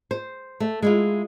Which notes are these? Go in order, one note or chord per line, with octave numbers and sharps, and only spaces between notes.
C5
A3
G#3 E4 F4